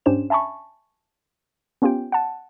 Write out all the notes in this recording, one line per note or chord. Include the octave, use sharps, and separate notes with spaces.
G#2 C#4 D4 G4 C5 E7
E5 G#5 A5 B5 C#6
B3 C#4 F4 G4 G5
F#5 A5